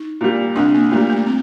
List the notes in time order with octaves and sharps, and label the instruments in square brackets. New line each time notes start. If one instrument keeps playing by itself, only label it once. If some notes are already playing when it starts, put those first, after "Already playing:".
Already playing: [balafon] D#4
[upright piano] A#2 G3
[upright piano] C2 [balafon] D4
[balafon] A#3
[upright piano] A#2 G3 [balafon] A3
[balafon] A3
C4